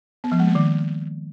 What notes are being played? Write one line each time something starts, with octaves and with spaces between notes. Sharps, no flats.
B3
F3
G#3
A#3
D#3